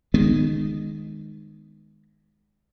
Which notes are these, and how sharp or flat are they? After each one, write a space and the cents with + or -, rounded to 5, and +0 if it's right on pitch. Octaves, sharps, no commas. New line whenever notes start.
D#3 -15 G#3 -5 B3 +0